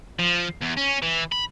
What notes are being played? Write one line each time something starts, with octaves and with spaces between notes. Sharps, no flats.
F3
E2
C#4
E3
B5